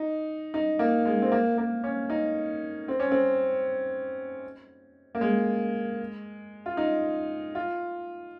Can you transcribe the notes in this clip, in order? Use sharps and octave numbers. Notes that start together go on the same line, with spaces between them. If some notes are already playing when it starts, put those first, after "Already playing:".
Already playing: D#4
D#4
A#3
G#3
C4
A#3
A#3
C#4
D#4
C4
C#4
C4
A#3
G#3
F4
D#4
F4